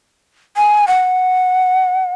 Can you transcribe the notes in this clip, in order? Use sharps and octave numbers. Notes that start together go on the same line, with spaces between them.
G#5
F#5